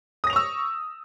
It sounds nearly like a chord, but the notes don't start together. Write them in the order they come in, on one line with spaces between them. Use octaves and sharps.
D#6 A#6 F7 C#6 E6